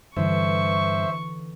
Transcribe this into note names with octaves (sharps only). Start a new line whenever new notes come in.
G2 D3 E3 C5 E5 C#6